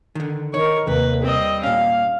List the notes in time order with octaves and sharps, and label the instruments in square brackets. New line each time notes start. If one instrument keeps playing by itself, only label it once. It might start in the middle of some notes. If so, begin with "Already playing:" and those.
[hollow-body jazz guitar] D3 D#3
[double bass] D#3 [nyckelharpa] A#4 C#6 [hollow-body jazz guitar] C#5
[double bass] D#2 A#3 [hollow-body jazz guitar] C3 [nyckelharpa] B4
[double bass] G3 [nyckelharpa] C4 D#5
[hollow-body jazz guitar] A#2 C#4 [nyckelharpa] F5